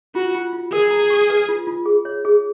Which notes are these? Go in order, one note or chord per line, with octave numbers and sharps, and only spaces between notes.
F4 F#4
F4
F4
G#4 A#4
A#5
C#6
B4
F4
F4
G#4
C#5
G#4